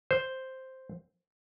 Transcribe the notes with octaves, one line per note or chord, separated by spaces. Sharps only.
C5